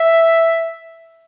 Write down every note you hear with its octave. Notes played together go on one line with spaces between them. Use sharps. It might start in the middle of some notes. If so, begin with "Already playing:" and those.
Already playing: E5